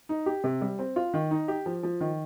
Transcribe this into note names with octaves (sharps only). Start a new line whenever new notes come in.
D#4
G4
C3
G3
C4
F4
D#3
D#4
G4
F3
F3
D#3